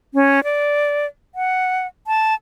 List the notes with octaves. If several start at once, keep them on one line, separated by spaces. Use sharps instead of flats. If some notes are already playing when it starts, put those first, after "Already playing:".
C#4
D5
F#5
A5